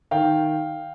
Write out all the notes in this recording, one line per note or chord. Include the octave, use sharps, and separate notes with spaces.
D#3 F5 G5